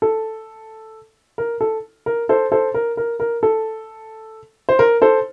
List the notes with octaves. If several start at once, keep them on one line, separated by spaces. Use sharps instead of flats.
A4
A#4
A4
A#4
A4 C5
A4 C5
A#4
A#4
A#4
A4
C5
A#4
A4 C5